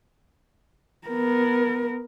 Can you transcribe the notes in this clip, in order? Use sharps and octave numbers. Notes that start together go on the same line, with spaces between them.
B3 A#4